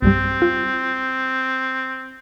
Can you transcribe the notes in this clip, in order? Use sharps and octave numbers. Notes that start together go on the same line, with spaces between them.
B1 G2 G3 C4
F4